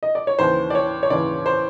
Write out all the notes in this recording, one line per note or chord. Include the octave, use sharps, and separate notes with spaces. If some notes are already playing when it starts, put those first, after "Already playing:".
D#5
D5
C#5
D#2 C#3 E3 C5
D5
C#5
C#5
D#2 C#3 E3 D5
C5